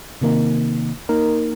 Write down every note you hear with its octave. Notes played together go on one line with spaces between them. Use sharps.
C3 D#3 A#3 D#4
A#3 D#4 A#4